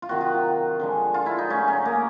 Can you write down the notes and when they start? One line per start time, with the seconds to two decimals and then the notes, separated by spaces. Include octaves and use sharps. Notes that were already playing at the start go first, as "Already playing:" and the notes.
0.02 F4
0.09 C3 D#3 F#3 F#4
0.21 F4
0.80 D3 F3 G#3
1.14 F4
1.26 E4
1.38 D#4
1.50 C#3 F#3 A3 C#4
1.68 C#4
1.85 A#3